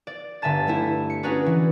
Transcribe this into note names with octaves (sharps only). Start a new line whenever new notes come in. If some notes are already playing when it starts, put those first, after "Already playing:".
D5
G1 E5 G#5 A5 A6
G3 A3 E4
C#7
C#4 D#4 F#4 G#4 B4 D5
E3